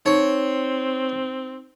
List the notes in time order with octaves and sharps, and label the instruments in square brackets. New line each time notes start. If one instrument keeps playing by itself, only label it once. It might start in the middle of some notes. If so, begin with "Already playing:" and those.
[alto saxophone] C4 [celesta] D#4 [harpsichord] C#5